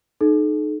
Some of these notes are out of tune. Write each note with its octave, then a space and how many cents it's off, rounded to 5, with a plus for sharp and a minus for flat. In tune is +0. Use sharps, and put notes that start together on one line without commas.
D#4 -25 A4 -45